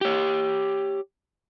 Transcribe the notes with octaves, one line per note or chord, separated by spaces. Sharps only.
G4 C#5